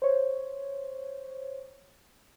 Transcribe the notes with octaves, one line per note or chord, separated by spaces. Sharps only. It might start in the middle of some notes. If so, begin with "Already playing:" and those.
C5 C#5